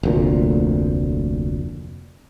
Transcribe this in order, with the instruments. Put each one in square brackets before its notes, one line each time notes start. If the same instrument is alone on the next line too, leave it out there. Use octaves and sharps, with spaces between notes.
[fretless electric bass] F1 D2 A#2